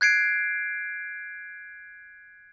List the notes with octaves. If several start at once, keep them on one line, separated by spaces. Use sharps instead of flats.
F#6 G#6 C7 D7